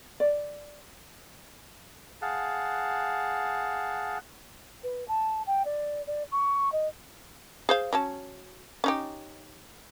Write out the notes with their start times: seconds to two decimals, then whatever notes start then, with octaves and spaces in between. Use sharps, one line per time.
0.20 D5
2.22 G#4 F5 F#5 A5
4.83 B4
5.08 A5
5.46 G5
5.65 D5
6.07 D5
6.31 C#6
6.72 D#5
7.69 G#4 C5 F5
7.93 F#3 C#4 A5
8.84 C#4 D#4 G4